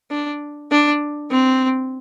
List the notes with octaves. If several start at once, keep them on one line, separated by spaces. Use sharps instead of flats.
D4
D4
C4